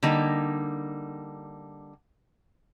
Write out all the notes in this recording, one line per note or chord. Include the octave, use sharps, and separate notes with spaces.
D3 G3 A#3 D#4